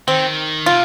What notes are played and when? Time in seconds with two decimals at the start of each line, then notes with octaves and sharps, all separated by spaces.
0.08 D#3 C4
0.66 C3 F4